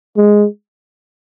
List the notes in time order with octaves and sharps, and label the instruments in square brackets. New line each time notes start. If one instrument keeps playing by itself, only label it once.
[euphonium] G#3